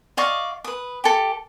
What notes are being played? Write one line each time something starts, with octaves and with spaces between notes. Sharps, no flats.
D5 D#5 F5 C#6
B4 D#6
G4 A4